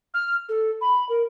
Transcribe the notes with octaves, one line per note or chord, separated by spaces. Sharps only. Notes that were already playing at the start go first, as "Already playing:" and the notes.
F6
A4
B5
A#4